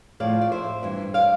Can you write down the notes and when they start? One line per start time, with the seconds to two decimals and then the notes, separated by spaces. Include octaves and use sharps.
0.20 A2 F3 D5 F5
0.41 D5
0.52 C5 E5
0.83 G2 E3
1.14 D5 F5